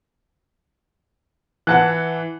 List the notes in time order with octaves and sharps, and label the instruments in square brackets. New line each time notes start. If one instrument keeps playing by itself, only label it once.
[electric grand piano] E3 [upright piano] F#5 A5 F#6